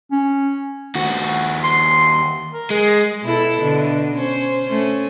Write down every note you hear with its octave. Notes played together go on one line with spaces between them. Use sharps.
C#4
D#2 F#4
C6
A#4
G#3 G#4
B2 E4 A4
B2 D3
C#4 C5
A3 C#4